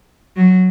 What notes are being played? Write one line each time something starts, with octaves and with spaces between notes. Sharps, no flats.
F#3